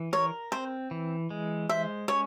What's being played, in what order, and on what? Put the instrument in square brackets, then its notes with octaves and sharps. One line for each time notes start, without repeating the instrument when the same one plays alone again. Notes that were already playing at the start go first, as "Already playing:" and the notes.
Already playing: [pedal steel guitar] E3
[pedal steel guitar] A#4 [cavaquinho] C#5
[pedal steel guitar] C4 [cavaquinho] C5
[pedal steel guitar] E3
G#3
[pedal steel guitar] C5 [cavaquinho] E5
[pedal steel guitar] C#4 [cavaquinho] C#5